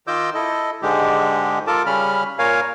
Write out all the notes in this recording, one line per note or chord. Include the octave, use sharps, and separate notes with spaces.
D#3 F4 D#5 D6 E6 G6
E4 A4 D#5
G#2 D3 G#3 G4
F4 A4 A#4 A5 D6
C#3 G3 C#4 B5 F6
A#2 A#4 C#5 F5 G#5